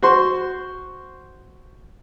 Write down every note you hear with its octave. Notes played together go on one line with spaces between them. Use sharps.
F#4 C5 C6